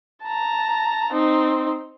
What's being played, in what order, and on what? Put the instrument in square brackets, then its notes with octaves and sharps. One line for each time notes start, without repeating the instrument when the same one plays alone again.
[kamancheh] A5 A#5
C4 D#4